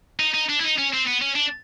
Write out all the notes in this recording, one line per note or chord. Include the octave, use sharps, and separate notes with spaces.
D#4
D#4
D4
E4
D#4
C#4
C4
B3
C#4
D4